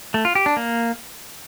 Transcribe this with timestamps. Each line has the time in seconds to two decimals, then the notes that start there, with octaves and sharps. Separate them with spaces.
0.14 A3
0.25 F4
0.35 G4
0.46 D4
0.57 A#3